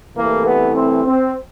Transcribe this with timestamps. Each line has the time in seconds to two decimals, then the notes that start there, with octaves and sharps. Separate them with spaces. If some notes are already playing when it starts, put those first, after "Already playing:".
0.15 C2 C3 E3 A3 A#3
0.45 B3
0.74 C4
1.05 C4